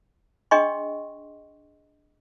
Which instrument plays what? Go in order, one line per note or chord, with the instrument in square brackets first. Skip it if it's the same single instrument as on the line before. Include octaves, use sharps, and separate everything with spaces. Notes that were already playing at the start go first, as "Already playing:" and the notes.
[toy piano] D4 G#4 D#5 G5 C6 C#6